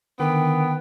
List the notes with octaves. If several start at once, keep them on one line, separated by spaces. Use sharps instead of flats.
D3 D#3 B3 A#4 G5